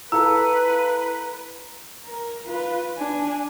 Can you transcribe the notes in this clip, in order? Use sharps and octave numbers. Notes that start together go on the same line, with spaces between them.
E4 F4 A4 B4 A#5 E6
A#4
F4 B4
D4 G#5